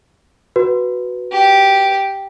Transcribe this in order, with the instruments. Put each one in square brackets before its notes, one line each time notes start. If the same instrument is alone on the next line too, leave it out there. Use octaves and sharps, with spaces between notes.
[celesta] F#4 B4
[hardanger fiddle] G4